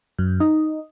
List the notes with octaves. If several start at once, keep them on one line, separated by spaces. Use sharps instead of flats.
F#2
D#4